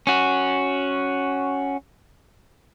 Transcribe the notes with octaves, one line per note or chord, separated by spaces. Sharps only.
C#4 F#4